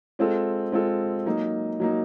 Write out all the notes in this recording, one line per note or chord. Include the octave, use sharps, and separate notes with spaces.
G#3 C4 F4 A4
G#3 C4 F4 A4
F#3 A#3 D#4
F#3 A#3 D#4